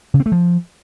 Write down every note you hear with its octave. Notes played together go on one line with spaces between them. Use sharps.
C#3
C4
A3
F3